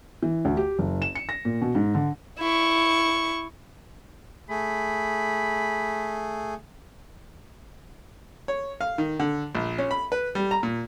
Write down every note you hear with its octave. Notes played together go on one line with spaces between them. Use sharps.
E3
D2
G4
F#1
E7
C#7
A#6
A#2
B2
G#2
D3
E4 C#6
A3 G#4 B5
C#5
F5
D#3
D3
A#1
C#4
B5
B4
G3
A#5
A#2